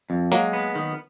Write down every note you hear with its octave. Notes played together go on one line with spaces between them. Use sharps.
F2
F#3 G#3 A#3
B3
D#3